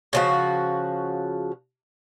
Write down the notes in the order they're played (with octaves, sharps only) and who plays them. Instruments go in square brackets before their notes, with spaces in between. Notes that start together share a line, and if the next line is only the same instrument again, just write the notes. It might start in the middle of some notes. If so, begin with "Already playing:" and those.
[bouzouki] C#3 F3 F#4